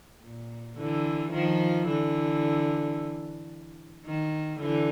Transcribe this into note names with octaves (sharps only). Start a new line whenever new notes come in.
A#2
D3 E3
D#3 F3
D3 E3
D#3
D3 E3